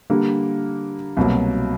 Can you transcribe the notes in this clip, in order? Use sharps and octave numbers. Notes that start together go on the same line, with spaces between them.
D3 G3 A#3
C2 B2 F#3 A#3